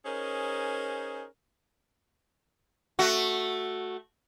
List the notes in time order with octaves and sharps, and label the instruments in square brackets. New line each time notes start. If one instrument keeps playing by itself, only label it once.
[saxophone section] C#4 D#4 G#4 A#4 C5
[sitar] A3 F#4